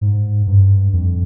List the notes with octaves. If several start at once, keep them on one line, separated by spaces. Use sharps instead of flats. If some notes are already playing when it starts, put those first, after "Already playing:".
G#2
G2
F2